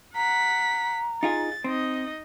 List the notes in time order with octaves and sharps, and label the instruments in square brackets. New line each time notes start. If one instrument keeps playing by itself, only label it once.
[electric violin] F#5 B6 [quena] A#5
[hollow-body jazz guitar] D#4 F4 G#4 [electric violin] A6
[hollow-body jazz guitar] C4 [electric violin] D#4 D#5